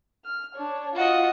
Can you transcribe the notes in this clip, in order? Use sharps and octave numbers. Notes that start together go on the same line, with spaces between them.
F6
D4 C#5
F4 F#4 D#5